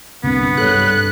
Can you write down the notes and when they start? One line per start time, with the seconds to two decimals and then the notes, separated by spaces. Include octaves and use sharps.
0.23 C2 G2 B3
0.57 G2 A4 C#5 F#6